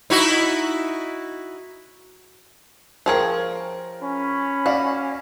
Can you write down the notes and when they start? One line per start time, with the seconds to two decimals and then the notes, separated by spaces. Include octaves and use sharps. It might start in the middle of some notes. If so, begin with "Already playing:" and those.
0.10 D#4 E4 F#4
3.06 F3 F4 G#4 A#4 C#5 G5
4.03 C#4 B5
4.66 F#4 D5 F5